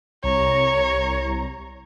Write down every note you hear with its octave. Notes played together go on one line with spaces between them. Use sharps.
C2 C#5 A#5